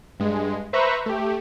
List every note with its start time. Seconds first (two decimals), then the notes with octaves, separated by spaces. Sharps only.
0.20 G2 G#3
0.73 B4 C5 E5 A#5 B5 C#6
1.06 A3 G4